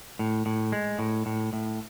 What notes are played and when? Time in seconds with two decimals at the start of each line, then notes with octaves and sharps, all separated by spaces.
0.19 A2
0.46 A2
0.72 G#3
0.99 A2
1.26 A2
1.53 A2